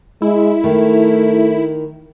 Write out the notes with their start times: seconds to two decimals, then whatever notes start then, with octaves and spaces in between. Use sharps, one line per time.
0.22 G#3 E4
0.64 D#3 A3